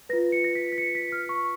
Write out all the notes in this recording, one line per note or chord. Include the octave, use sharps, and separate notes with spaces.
F4 B4 A#6
C#7
A#6
B6
B6
C#7
B6
F6
C#6